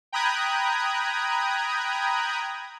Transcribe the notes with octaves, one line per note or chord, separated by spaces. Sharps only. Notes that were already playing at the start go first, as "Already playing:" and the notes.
G5 A#5 B5 D#6 F#6 G#6